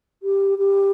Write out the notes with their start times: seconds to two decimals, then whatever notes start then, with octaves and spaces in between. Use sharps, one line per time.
0.23 G4
0.58 G4